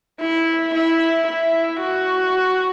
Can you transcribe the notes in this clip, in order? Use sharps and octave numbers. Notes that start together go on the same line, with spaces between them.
E4
E4
E4
F#4